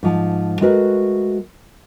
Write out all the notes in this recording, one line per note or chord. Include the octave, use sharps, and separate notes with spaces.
G#2 F3 A5
G#3 A3 F#4 A#4 B4